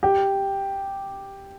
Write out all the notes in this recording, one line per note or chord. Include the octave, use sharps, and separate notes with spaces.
G4